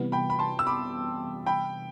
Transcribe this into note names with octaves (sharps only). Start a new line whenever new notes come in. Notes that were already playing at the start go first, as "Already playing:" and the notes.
Already playing: C3 E3 G3 B3
G5 B5
B5
A5 C6
E6
B5 D6
G5 B5